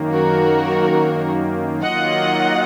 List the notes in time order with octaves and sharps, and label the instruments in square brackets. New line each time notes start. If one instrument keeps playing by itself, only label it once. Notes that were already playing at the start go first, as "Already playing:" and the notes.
Already playing: [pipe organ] F#2 D#3 A#3
[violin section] F#4 A#4
[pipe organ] D#3 F#3 A#3 F4 [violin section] D#5 F#5